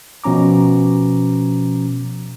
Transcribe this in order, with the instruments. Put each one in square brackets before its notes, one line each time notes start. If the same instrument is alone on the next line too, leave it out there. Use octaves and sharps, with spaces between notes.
[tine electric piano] B2 F3 C#4 A#5 D6